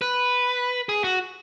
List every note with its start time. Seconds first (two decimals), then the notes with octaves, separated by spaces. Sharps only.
0.02 B4
0.89 G#4
1.04 F#4